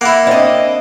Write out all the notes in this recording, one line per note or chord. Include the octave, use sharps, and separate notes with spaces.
A#3 E4 F#5
C4 D4 D#5